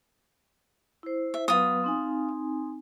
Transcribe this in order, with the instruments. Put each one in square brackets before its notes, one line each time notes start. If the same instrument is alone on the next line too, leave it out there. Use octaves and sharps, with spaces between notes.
[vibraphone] E4 C5
[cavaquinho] E5
[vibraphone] F#3 B3 B4 [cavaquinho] F4 D#6
[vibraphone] C4 D#4 G#5